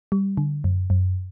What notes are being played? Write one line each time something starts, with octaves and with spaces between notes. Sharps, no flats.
G3
D3
F#2
F#2